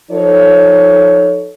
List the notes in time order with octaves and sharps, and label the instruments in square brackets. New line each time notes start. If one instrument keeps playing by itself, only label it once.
[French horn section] F3 D#4 A4 C#5